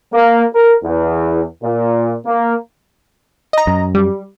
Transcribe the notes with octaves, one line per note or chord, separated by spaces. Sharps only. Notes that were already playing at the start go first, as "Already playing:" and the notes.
A#3
A#4
E2
A#2
A#3
D#5 A#5
F#2
G3